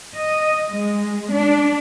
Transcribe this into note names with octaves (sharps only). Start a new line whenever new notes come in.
D#5
G#3
D4